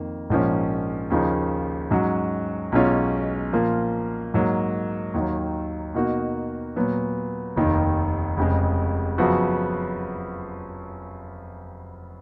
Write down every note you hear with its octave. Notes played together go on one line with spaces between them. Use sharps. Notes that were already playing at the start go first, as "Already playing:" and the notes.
Already playing: F2 D#3 A#3
A#1 G#2 F3 A#3 C#4
D#2 C#3 F3 A#3 D#4
G#2 F#3 C#4 F#4
B1 B2 G#3 C#4 F4
A#2 F3 A#3 F4
G#2 F#3 A#3
D#2 D#3 F#3
B2 A#3 D#4 F#4
A#2 F#3 B3
F1 D#2 D#3
F1 F2 C#3 G#3
F#2 C#3 F3 B3 F#4